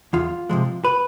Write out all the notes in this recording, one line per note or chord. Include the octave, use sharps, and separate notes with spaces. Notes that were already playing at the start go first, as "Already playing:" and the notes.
E2 F4
C3 F3 G#3
B4